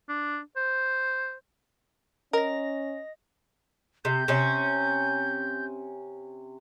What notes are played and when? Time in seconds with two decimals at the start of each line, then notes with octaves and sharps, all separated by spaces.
0.09 D4
0.57 C5
2.33 C#4 A#4 D#5 A#6
4.05 C3 G6
4.28 C3 C#4